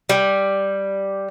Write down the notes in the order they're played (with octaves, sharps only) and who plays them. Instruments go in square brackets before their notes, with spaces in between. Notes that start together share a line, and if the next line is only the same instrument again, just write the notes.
[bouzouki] G3